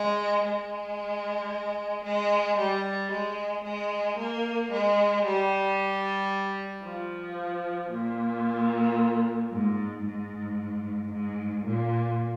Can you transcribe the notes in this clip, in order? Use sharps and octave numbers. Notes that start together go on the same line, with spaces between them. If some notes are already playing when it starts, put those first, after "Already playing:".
Already playing: G#3
G#3
G#3
G3
G#3
G#3
A#3
G#3
G3
F3
A#2
G#2
G#2
G#2
A#2